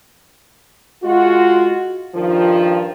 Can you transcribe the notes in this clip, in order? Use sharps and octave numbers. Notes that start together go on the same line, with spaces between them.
G#3 F4 F#4
G2 D#3 F3